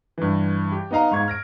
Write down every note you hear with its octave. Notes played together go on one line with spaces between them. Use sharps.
G2 E3
G4
B3 D#4 D#5 F5 A#5
G#2 F5 C#6 G#6
F6 A#6 D7